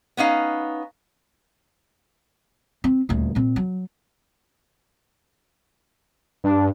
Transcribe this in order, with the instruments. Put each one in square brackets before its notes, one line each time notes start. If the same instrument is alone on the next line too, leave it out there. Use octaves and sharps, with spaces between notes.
[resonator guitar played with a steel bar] B3 C#4 D#4 F5
[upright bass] C4
D#1 D2
A#2 C4
F#3
[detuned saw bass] G2 [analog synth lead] D4